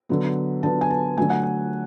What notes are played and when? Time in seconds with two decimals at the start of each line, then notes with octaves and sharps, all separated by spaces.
0.09 D3 F#3 B3
0.63 D3 F#3 B3 A5
0.81 G#5
0.90 A5
1.17 D3 F#3 A3 G#5
1.30 F#5
1.43 G#5